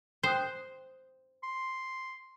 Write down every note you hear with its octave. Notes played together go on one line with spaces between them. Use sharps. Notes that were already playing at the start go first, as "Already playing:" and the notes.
C5 G5 D#6 F#6
C6